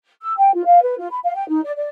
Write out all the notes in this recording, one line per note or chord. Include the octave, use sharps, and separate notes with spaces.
E6
G5
F4
F5
B4
F4
B5
F5
G5
D#4
D5
D5